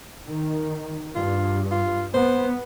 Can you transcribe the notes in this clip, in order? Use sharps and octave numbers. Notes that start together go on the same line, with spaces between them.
D#3
G2 F4
F4
B3 C5